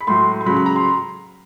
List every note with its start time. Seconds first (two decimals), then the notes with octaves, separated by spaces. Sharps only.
0.01 B5
0.07 A2 F#3 C6
0.41 C6
0.46 C#3 F#3 B5
0.57 B5
0.66 A#5
0.76 C6